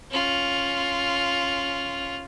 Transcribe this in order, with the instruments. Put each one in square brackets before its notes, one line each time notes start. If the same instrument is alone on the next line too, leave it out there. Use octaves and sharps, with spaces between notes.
[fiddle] C#4 F4